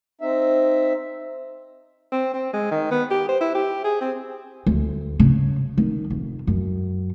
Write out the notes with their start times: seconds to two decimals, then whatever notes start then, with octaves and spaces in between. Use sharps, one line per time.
0.21 C4 D#4 E5
2.12 C4
2.34 C4
2.53 G#3
2.71 D#3
2.91 B3
3.11 G4
3.29 C5
3.41 E4
3.55 G4
3.84 G#4
4.01 C4
4.66 D2
5.19 C#3
5.78 D#3
6.10 F1
6.47 F#2